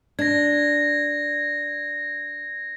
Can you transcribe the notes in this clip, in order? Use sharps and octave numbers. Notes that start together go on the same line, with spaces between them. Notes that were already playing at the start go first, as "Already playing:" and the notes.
D4 G#6 A#6